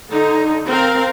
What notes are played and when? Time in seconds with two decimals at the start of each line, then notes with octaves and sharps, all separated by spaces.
0.11 D3 D#4
0.67 C4 A#4 F5